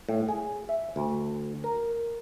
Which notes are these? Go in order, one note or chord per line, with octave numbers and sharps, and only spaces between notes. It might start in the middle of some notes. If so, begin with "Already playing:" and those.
A2
G#4
E5
D2
A#4